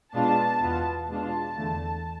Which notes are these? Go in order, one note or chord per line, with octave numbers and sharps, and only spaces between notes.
B2 G#3 B3 D4 F4 A5
E2 B2 B3 F4
B2 G#3 D4 F4 A5
E2 D3 A3